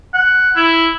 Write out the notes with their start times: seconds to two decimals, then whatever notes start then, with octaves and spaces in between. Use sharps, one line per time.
0.14 F#5
0.56 E4